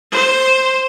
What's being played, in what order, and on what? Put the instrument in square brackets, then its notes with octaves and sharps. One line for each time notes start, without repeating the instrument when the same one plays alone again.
[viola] C5